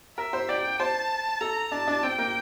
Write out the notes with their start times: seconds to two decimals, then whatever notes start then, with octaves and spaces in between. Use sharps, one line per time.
0.17 A#4 E5
0.33 C5
0.49 D5 G5
0.79 C5 A5
1.40 A4 A#5
1.71 D4 A5
1.87 D4
2.03 C4 G5
2.18 A#3